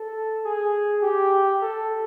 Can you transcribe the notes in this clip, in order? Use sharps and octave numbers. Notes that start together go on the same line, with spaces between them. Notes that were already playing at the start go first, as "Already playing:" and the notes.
Already playing: A4
G#4
G4
A4